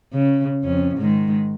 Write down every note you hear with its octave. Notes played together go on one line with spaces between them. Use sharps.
C#3
F2 C#4
G#2 D#3 G#3